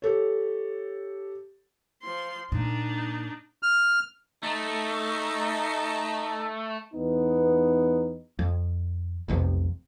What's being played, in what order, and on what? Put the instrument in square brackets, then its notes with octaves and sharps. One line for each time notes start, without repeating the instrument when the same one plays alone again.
[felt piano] G4 A4 C#5
[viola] F3 C6
[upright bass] A#2 [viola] D4 D#4
[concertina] F6
[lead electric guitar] A3 [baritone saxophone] D#4
[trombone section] E2 B3 D#4
[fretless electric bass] F2
F1 B1 F2 C3